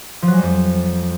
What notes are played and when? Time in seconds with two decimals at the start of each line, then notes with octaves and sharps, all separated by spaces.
0.22 F3
0.28 F#3
0.33 G#3
0.38 G3
0.43 F2